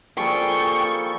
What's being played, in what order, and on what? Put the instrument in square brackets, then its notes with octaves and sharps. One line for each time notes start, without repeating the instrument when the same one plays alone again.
[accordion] F3 A#3 A4 [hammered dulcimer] G3 G#4 [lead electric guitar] G5 [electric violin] C#6